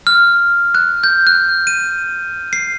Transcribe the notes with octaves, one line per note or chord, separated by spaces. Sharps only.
F6
F#6
G6
F#6
D#7
C7